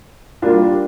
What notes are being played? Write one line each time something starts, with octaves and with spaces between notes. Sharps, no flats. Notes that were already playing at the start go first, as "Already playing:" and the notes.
G3 A#3 D4 F4